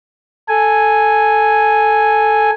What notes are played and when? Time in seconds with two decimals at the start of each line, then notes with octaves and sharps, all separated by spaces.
0.49 A4 G#5